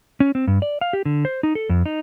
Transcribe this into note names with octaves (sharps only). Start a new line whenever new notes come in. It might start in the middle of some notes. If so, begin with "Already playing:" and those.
C#4
C4
G2
D5
F5
G4
D3
C5
D#4
A4
F2
D#4